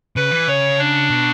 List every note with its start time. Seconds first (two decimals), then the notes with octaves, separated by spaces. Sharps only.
0.16 C#3 B4
0.31 E3
0.47 C#3 C#5
0.79 D4
1.10 B2